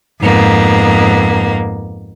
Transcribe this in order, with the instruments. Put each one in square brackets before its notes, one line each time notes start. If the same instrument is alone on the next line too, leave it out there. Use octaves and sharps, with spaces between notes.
[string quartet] F2 G#2 A#3 B3